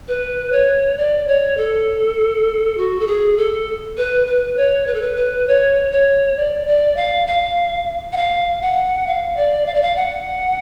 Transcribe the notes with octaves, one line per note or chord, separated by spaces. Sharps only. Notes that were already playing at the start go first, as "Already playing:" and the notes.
B4
C#5
D5
C#5
A4
F#4
A4
G#4
A4
B4
B4
C#5
B4
A4
B4
B4
C#5
C#5
D5
D5
F5
F5
F#5
F5
F#5
F5
D5
F5
D5
F5
F#5